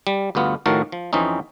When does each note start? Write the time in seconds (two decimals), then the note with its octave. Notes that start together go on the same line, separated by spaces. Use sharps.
0.07 G3
0.35 D2 G2 B3 F4
0.66 A2 D#3 F3 F#4 A#4 A5
0.92 F3
1.13 F2 E3 C4 C#4 D#4